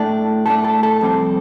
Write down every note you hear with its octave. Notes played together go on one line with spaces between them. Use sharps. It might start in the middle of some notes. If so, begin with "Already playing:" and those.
Already playing: A2 A3 D4
A2 A3 D4 A4
A4
A4
F2 C3 G3 C4